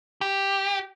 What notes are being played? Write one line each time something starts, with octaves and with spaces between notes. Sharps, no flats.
G4